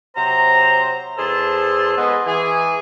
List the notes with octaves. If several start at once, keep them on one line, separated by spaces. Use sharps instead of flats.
C3 F#3 C5 A#5
E2 G#4 A4 C5 A5
G#3 B3 G#4 B4 D#5
E3 G#4